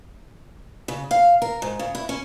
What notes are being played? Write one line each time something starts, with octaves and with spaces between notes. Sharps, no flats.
C#3
F5
A#4
G#2
C#3
E4
C#4